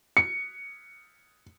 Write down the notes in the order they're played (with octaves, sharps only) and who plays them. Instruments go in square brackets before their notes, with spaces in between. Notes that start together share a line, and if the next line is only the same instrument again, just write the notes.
[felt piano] C#7